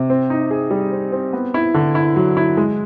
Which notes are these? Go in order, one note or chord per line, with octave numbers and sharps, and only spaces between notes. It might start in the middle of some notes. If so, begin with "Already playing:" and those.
Already playing: C3
C4
D#4
G#4
G3
C4
C4
B3
E4
D3
E4
F#3
E4
G#3